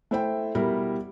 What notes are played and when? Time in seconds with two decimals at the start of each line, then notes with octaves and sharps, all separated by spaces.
0.11 A3 E4 C5 E5 G5
0.55 B2 G3 E4 A#4